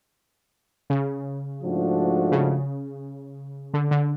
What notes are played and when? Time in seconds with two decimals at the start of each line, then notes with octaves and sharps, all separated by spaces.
0.90 C#3
1.61 G#2 F3 A3 D4 F#4
2.32 C#3
3.74 D3
3.91 D3